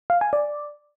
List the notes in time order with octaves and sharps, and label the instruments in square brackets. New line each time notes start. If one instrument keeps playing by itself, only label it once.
[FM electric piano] F5
G#5
D5